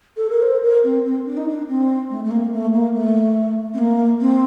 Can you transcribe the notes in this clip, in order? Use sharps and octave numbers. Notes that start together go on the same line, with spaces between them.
A4
A#4
C5
A#4
C4
C4
D4
D#4
D4
C4
A3
A3
A#3
A3
A#3
A3
C4
A#3
C4